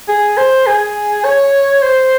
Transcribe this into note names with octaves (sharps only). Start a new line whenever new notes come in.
G#4
C5
G#4
C#5
C5